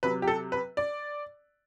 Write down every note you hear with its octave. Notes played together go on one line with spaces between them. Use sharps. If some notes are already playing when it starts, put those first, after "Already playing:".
C3 F#3 B4
G4
A4
B4
D5